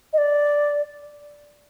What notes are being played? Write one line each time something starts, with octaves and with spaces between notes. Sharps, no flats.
D#5
D5